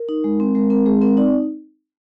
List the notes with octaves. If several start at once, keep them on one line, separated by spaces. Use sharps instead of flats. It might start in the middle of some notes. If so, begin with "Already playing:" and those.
Already playing: A#4
D#4
G#3
C4
G#3 A#4
C4 A#4
G#3 G#4
C4 A#4
D#4 D5